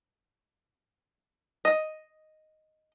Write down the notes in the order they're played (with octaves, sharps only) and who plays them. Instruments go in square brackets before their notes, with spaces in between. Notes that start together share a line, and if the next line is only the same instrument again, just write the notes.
[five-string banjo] D#5